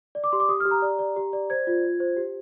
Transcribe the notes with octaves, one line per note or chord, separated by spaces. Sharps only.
D5
D6
G4 C6
D6
G4 D#6
F6
G4
A#5
D5
D5
G4
D5
C5 G#6
F4
F4
C5
G4